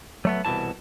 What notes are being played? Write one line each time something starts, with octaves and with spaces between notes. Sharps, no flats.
F#3 A3 B3
C2 B2 D#3 E3 A5